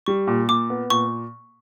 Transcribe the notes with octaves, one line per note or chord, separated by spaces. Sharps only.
G3 C#6
A#2
A#2 D6
B3
A#2 C#6